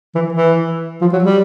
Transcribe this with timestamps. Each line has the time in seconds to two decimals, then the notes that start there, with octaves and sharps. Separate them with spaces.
0.15 E3
0.33 E3
1.01 F3
1.13 F#3
1.24 G3